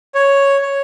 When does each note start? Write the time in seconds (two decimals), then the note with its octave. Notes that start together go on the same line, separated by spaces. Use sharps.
0.15 C#5
0.62 C#5